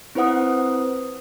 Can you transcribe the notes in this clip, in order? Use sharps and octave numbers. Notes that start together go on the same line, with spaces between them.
C4 E4 B4 C5 F#5 D#6